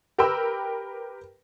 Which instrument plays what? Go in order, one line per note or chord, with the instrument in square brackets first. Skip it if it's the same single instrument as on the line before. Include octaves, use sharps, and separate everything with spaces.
[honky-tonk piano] G4 A#4 B4 G5 B5 E6